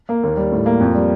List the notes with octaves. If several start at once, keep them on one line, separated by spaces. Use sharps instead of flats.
A#3
D#2
G3
A2
A#3
F2
G3